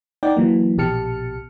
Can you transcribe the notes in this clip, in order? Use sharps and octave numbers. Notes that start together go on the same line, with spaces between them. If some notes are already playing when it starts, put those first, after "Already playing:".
D#4 D5 F#5 G5
E3 F#3 A#3
A#1 B2 G4 A5 F6 C#7